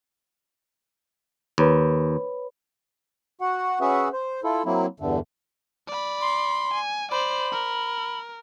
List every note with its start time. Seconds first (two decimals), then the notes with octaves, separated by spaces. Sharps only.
1.58 D#2 B4 C#5 B5
3.41 F#4 F#5
3.81 C#4 F#4 G#4 B4 E5 F#5
4.13 C5
4.44 E4 F4 A4
4.65 F#3 A#3 C4 E4
5.00 E2 G2 D3 A3
5.88 D5 B5
6.21 C6
6.74 G#5
7.11 C5 D5 B5
7.52 A#4